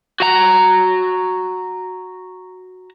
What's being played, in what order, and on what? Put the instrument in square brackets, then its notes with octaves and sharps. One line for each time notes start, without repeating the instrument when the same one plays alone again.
[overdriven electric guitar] F#4 A#5